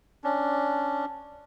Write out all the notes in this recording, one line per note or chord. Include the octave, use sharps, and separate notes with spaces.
C#4 D4